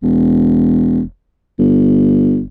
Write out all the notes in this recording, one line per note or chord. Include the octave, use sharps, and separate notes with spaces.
E1
G1